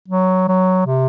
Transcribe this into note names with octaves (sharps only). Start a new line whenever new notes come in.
F#3
F#3
C3